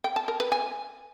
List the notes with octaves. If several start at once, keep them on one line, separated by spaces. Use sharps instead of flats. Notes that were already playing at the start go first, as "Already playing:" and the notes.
G5
A5
A#4
B4
G#5